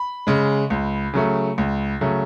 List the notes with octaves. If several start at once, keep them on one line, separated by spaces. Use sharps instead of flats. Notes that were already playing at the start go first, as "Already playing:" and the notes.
Already playing: B5
C#3 G#3
C#2
C#3 F#3 A3
C#2
C#3 F#3 A3